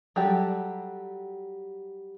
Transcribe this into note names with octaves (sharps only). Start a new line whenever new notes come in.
F#3 G3 G4 A4